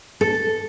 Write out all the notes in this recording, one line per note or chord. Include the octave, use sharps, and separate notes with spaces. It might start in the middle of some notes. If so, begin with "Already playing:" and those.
A4